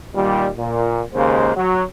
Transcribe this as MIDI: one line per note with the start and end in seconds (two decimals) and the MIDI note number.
0.15 0.49 46
0.15 0.49 51
0.15 0.49 55
0.58 1.02 46
1.14 1.51 39
1.14 1.51 49
1.14 1.51 56
1.14 1.51 58
1.14 1.51 72
1.56 1.83 54